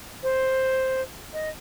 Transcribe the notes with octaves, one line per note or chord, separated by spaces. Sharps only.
C5
D#5